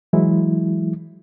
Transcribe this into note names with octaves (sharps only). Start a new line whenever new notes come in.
E3 F#3 G#3 E4